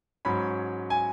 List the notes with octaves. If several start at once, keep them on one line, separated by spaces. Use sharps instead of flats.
G#2 F#3 C#4 B5
G#5